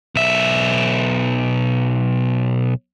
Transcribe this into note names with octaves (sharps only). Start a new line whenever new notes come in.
B1 E5